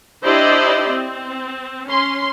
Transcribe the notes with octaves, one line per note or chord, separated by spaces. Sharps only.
D4 E4 G4 C5 D5 D#5
C4
C#4 C6